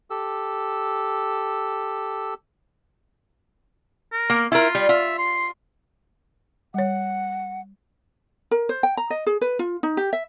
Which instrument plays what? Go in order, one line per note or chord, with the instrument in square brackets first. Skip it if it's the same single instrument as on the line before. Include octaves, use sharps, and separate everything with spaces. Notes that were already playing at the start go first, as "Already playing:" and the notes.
[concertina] G4 A4 E6
[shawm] A#4
[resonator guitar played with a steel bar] A#3
[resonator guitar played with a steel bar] E4 A#4 [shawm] F4
[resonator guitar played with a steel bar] G3
[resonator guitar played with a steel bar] F4 [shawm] E5
[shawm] C6
[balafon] G3 C#5 [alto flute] F#5
[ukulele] A#4
C5
G5
A#5
D#5
G#4
B4
F4
D#4
G4
E5